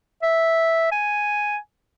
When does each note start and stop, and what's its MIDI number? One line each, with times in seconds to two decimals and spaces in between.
0.23 0.87 76
0.92 1.57 80